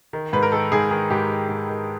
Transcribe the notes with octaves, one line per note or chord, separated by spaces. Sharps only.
D#3
G#2 B4
A#4
D#3 A4
G#2 G#4
D#3 G#4
G#2 G4
D#3
G#2
D#3